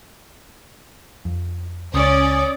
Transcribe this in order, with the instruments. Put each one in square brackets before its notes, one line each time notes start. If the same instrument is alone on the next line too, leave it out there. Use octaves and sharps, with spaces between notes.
[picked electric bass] F2
[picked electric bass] C#2 [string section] C#4 D5 [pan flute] D#6